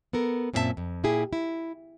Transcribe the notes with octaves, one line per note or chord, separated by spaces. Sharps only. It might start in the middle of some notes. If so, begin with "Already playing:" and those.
B3 A4 A#4
F#2 A#2 C4 E4 E5 A5
F2
A#2 E4 G4 G#4
E4